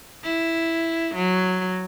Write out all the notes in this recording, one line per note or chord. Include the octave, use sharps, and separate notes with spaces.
E4
F#3